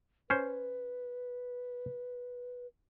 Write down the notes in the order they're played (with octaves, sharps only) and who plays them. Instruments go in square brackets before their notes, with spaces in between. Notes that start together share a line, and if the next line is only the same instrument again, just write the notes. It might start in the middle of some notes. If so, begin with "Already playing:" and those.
[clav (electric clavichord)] C#4 C5 [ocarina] B4